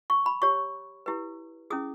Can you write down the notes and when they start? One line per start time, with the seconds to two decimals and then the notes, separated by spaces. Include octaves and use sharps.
0.10 C#6
0.26 B5
0.42 G4 C#5 C#6
1.06 E4 G4 B4
1.70 C#4 E4 G#4 D#6